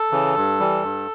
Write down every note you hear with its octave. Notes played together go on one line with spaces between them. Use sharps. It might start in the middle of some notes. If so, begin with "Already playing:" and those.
Already playing: A4
C#3 E3
G2
E3 G3
G2